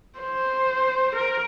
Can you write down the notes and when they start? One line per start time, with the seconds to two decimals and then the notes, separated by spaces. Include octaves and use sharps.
0.19 C5
1.16 A#4